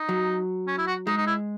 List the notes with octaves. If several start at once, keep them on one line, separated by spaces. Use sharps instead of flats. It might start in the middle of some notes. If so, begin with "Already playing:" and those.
Already playing: D#4
F#3
C#4
E4
F#4
G#3 D#4
D#4
E4